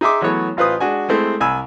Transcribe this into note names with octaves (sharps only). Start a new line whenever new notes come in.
D#4 G#4 E5 C6 D6
E3 F#3 A3 B3 C#5
A1 F4 B4 C5 D#6
G#3 D4 F#4 G#5
G#3 A3 C4 E4
C2 G#5 B5 E6